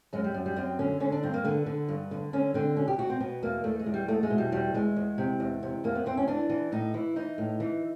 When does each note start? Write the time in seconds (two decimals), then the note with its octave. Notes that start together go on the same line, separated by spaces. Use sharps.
0.13 F#2 G#3
0.24 G3
0.34 F#2
0.46 G3
0.56 F#2 C4
0.79 D3 C#4
1.00 D3 C#4
1.12 D4
1.23 G2 C4
1.34 A#3
1.44 D3 B3
1.66 D3
1.88 G2
2.11 D3
2.33 D3 C#4
2.54 D3 C4
2.76 B2 C#4
2.88 G4
2.98 B2 F#4
3.10 C4
3.20 B2 B3
3.42 E2 A#3
3.64 E2 A3
3.79 G#3
3.86 E2
3.94 G3
4.08 E2 A3
4.23 G#3
4.30 B2
4.38 G3
4.52 E2 G3
4.74 E2 G#3
4.96 E2
5.18 C3
5.40 E2
5.63 C3
5.84 E2 A#3
5.95 B3
6.06 E2 C4
6.17 C#4
6.28 E3 D4
6.49 E3
6.72 A2 D#4
6.94 E3 E4
7.16 E3 D#4
7.38 A2
7.60 E3